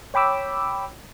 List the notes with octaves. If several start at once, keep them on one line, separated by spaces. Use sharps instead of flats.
C#5 G5 B5 D6 E6